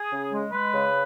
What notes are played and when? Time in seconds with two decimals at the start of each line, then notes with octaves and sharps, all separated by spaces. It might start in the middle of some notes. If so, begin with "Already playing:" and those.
Already playing: G#4
0.12 C#3
0.32 G#3
0.52 G#3 B4
0.74 C#3